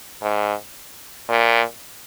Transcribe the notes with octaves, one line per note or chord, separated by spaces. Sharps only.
G#2
A#2